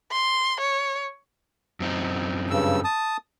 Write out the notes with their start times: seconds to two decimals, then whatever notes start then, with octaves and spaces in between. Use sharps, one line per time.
0.12 C6
0.60 C#5
1.80 F#2 C4 D#4
2.51 G2 C#3 E6
2.84 A5 D#6